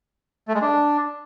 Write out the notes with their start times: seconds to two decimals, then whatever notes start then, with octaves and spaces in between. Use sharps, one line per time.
0.48 A3
0.55 G#3
0.62 D4